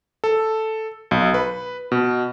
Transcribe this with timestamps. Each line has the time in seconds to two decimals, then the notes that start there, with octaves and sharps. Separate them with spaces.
0.24 A4
1.11 B1
1.34 B4
1.92 B2